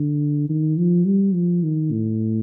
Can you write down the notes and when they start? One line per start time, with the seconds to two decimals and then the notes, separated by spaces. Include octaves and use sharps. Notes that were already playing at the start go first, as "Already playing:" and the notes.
Already playing: D3
0.49 D#3
0.77 F3
1.06 G3
1.34 F3
1.63 D#3
1.92 A2